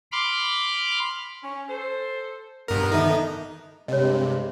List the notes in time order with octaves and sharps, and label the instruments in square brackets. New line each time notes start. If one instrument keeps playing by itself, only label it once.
[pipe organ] B5 C6 D6 F6
[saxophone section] C#4
A4 C5
[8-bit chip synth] G2 A#4 [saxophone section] A#3 B3
[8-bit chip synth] D#3 D#4 [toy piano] A4 E5 A5
[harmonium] G2 G3 G#3 [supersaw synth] C3 [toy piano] C#5 D#5